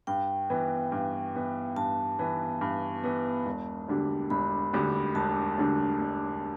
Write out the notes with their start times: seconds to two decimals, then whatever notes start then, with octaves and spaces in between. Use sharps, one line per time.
0.07 G2 G5
0.50 E3 B3
0.92 G2
1.35 E3 B3
1.76 G2 A5
2.19 E3 B3
2.61 G2
3.04 E3 B3
3.46 E1
3.88 D2 D3 G3 D4
4.30 E1 B5
4.73 D2 D3 G3 D4
5.15 E1 A5
5.58 D2 D3 G3 D4
6.01 E1